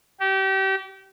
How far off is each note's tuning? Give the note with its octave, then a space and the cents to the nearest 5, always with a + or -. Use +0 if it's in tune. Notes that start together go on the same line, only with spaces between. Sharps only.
G4 -30